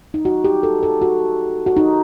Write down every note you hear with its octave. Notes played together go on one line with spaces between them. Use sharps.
D#4
F#4
G4
A4
A4
F#4
F#4
D#4